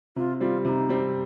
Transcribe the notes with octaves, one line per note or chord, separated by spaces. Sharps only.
C3 F4
G3 C4 F4
C3 D#4 F4
G3 C4